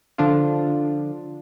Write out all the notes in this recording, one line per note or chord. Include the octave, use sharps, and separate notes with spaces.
D3 F3 D4 F4